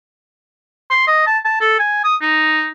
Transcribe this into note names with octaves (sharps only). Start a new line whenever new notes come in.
C6
D#5
A5
A5
A4
G#5
D#6
D#4